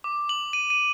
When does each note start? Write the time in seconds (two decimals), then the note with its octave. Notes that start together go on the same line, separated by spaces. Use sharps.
0.04 D6
0.29 F#7
0.53 D#7
0.70 D#7